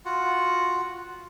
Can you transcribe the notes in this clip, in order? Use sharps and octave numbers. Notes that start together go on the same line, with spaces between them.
F4 F#4 F#5